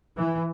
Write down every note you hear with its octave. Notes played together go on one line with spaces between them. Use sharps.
E3